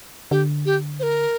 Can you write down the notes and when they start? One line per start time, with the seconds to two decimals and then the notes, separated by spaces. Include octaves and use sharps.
0.31 D3 G4
0.66 G4
0.99 C5
1.03 A#4